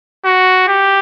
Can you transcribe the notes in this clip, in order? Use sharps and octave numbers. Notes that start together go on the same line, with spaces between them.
F#4
G4